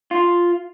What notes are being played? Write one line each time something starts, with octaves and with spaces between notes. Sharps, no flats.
F4